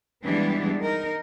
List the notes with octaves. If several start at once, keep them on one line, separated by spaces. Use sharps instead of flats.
E3 G3 G#3 B3 D4
D#4 A#4